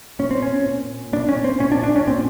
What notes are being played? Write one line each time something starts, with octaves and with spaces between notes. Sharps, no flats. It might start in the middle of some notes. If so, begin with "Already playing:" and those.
A#2 C#4
C4
C#4
A#2
A#2 D4
C#4
C4
A#2 C#4
D4
D4
C#4
A#2 C4